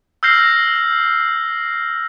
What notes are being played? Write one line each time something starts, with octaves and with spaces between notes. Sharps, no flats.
E6 F6 G6 A#6 C7